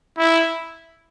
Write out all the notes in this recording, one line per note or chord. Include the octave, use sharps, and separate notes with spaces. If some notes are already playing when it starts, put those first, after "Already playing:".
E4